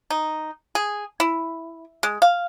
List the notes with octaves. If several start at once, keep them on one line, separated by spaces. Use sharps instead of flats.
D#4
G#4
E4
G#3
F5